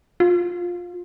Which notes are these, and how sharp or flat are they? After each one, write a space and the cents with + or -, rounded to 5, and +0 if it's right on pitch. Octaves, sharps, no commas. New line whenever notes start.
F4 +15